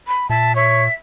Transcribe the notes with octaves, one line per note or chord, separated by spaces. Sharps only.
B5
A#2 E5 A5
C#5 E5